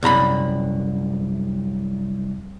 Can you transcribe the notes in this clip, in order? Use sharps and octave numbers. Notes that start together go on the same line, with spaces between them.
C2 F#2 A#5 B5